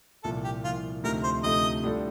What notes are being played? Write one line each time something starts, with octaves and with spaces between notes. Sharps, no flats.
C2 A#2 F3 A4
G4
C2 A#2 F3 F4
D2 C3 F3 A3 D#4 A#4
C5
D2 C3 F3 A3 D#4 D#5
A2 G3 D4 F4 A4